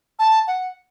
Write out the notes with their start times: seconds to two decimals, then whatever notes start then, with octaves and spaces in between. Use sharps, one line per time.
0.19 A5
0.47 F#5